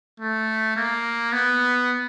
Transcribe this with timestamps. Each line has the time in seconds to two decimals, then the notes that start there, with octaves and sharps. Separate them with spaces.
0.20 A3
0.76 A#3
1.32 B3